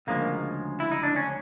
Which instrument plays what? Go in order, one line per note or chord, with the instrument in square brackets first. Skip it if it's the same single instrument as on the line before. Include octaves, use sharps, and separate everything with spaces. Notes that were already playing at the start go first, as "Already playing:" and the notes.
[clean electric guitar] D2 C#3 F3 G#3 A#3
E4
D#4
D4
C#4